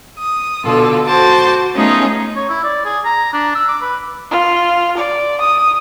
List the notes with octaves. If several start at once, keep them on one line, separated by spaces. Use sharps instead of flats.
D#6
B2 D3 F4 A4
F#4 C5 A5 D6
A3 B3 C#4 D#4 F4 G#4
C#5
E4
D5
G#4
A#5
D4
E6
D6
B4
F4
D5
D#6